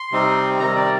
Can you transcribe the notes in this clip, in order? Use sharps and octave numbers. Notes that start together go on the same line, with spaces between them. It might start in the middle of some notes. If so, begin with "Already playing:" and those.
Already playing: C6
C3 G3 C4 D#4
C3 D#3 G3 A#5
D5